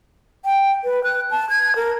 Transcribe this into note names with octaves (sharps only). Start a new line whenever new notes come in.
G5
B4
F#6
A5
G#6
A#4